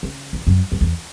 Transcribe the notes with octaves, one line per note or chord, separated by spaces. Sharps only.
C#3
E2
F#2
F#2
E2